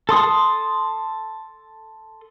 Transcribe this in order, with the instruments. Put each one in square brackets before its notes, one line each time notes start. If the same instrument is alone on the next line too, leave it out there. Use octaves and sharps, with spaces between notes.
[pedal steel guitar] A4 C6 D#6